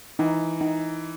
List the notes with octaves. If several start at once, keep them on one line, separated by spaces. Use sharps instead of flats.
E3 D#4
D#4